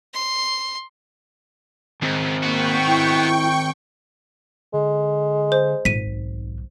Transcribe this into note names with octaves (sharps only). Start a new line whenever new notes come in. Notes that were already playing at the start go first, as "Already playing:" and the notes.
C6
C#2 D#3 C4 C5
A#3 B3 F#4 G5 C#6
E4
D3 G#3
C5
G#1 A#2 B6 D#7
B1